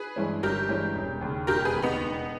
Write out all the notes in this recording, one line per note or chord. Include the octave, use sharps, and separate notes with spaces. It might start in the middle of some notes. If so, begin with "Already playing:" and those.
Already playing: G#4 B4
G2 E3 G#3 C#4
G1 G4 A#4
G2 E3 G#3 C#4
E1
D#2 C#3
E1 G4 A#4
G#4 B4
D#2 C#3
B3 D#4
E1